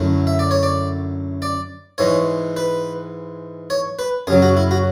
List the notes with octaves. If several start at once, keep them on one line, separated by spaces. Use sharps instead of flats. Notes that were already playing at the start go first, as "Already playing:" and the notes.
Already playing: F#2 D3 A3 E4
E5
D5
C#5
D5
D5
G#2 E3 G#3 C#5
B4
C#5
B4
F#2 C#3 F#3 G#4
F#4
E4
F#4